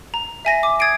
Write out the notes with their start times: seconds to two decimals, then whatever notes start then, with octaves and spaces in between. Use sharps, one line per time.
0.14 A#5
0.45 E5 G#5 A#6 D#7
0.63 D6
0.79 D#6 G#6 A6 C7 D7 D#7